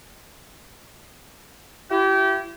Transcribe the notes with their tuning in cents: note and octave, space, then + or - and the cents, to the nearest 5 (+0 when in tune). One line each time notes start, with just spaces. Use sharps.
E4 +30 G4 -30